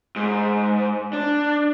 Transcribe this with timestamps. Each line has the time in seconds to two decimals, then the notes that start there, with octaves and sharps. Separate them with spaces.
0.16 G#2
1.13 D4